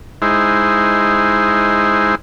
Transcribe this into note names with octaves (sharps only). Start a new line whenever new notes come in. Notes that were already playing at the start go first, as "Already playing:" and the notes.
G#3 D#4 E4 C5